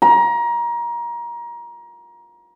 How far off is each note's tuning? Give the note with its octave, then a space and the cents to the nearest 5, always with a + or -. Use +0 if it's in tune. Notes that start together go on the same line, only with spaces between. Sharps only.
A#5 +25